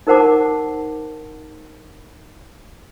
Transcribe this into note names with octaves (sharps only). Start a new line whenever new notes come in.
D#4 A#4 C5 F#5 A5 D6